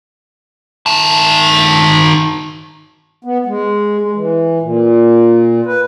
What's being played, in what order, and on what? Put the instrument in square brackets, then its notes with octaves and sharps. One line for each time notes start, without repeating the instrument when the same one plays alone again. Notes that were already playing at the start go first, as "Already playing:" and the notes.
[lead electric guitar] D#3 A5
[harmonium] B3
G#3
G#3
E3
A#2
B4